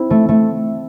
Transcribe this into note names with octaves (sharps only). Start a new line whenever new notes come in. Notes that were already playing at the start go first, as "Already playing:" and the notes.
Already playing: C4 E4
A3
A3